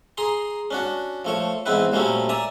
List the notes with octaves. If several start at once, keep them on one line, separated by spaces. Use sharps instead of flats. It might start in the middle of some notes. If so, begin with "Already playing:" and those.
G#4 A#5 C6
C#4 D4 F#4
F3 A3 C#5
E2 G#2 C4 E4 B4
A#2 F#3 G3 A3 C4 C#4
D5 E5 G#5 A#5